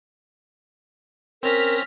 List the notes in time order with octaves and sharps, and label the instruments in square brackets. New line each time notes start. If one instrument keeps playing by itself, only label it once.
[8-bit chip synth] C4 C#4 [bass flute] A#4 [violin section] F6 A#6 B6